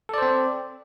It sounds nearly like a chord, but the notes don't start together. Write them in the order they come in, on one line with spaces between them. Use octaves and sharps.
A4 D5 C5 C4